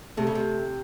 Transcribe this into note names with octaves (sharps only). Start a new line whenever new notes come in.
C3 A3
C#3
C3